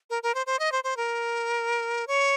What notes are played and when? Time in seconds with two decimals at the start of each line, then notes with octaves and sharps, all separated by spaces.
0.10 A#4
0.23 A#4
0.34 C5
0.46 C5
0.59 D#5
0.72 C5
0.84 C5
0.97 A#4
2.07 C#5